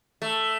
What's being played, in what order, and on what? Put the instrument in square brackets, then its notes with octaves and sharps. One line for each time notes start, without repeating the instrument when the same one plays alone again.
[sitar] A3